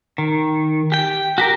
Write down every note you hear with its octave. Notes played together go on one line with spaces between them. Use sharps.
D#3
G4 G5
F#4 G4 A#4